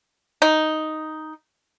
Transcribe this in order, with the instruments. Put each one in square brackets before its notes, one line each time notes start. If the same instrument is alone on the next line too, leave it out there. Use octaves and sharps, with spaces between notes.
[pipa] D#4